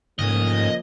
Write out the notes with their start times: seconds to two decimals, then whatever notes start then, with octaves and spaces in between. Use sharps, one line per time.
0.19 D2 G#2 F3 A#3 C#4 D#5